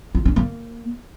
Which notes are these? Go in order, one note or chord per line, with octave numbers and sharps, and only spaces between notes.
F4
D4
A#3